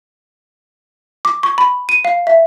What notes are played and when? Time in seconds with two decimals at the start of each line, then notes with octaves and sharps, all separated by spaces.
1.25 D6
1.43 C#6
1.58 B5
1.89 D#7
2.05 F5
2.27 E5